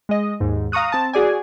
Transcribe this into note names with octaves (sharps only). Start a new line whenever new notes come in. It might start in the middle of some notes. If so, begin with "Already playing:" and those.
G#3 D#5
D#2 G#2
F5 A#5 C#6 D#6 F#6
C4 A5
F#4 G#4 D5 G#5